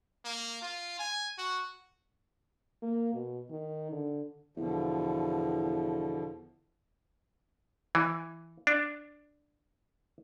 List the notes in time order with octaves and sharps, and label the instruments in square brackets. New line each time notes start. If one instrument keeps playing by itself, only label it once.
[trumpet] A#3
F4
G#5
F#4
[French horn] A#3
B2
D#3
D3
[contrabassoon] E2 [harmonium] B2 D3 F3
[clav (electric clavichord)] E3
D4